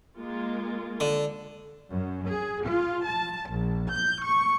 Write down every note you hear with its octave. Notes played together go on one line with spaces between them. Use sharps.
G#3 A#3 F4
D3
F#2
G#4
F4
A5
A#1
G6
C#6